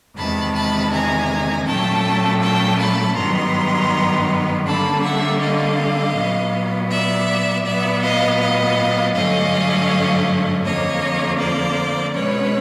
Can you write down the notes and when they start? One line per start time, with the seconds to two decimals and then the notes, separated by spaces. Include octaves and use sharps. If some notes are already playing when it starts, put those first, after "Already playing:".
0.16 E2 C3 D#3 G#3 A5 B5
0.54 A5 B5
0.91 G#5 A#5
1.65 A#2 F#3 A3 C#4 G5 A5
2.40 G5 A5
2.78 A5 B5
3.15 G2 D#3 F#3 B3 A#5 C6
4.65 D3 G3 A#3 C#4 A5 B5
5.02 E5 F#5
5.40 D#5 F5
6.15 A#2 F#3 B3
6.89 D5 E5
7.64 A#2 F#3 B3 D5 E5
8.02 D#5 F5
8.39 D#5 F5
9.14 G2 D3 F#3 A3 C#4 D#5 F5
10.64 F2 D3 F3 A#3 C#5 D#5
11.38 C5 D5
12.13 B2 G#3 C#4 B4 C#5